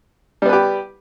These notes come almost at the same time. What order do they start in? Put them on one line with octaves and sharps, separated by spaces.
G3 B3 B4 G4